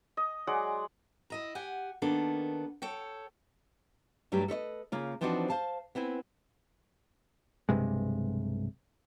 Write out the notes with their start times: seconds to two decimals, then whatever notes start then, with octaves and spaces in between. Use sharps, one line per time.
0.17 D#5
0.47 F#3 G#3 D5 F#5
1.30 E4 D#5 A#5
1.55 G4 F#5 G#5
2.02 D#3 A#3 B3 D4 A4
2.82 A4 C#5 G5
4.32 G2 F#3 G3 A3 D4 G4
4.48 A4 B4 C#5 D#5
4.92 C#3 A#3 F4
5.21 E3 F3 C4 D4 D#4 F#4
5.50 C5 F5 A5
5.95 B3 C4 E4 G#5
7.69 B1 G2 C3 G#3